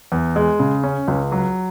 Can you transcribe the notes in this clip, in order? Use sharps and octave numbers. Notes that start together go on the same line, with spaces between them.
E2
G#3
C#3
C#4
C#2
F#3